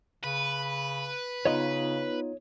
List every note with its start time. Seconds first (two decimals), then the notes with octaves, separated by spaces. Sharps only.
0.24 C#3 B4
1.45 C#3 B3 D#4 F4 C#5 D#5